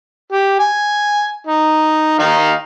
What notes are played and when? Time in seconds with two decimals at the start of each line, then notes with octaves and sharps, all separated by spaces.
0.33 G4
0.60 G#5
1.47 D#4
2.19 D#3 D#4 F5